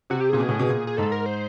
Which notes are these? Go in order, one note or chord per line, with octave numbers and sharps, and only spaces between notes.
C3 F#4
G4
A#2 G#4
B2
A2
B2
A#2
G#4
G#2 A4
A#4
C5